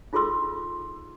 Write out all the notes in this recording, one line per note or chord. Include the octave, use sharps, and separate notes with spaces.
D#4 F4 G#4 A4 C6 E6